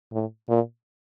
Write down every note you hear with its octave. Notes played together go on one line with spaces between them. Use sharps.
A2
A#2